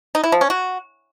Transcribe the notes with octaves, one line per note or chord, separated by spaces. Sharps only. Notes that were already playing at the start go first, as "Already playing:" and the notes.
D#4
E4
F3
C#4
F#4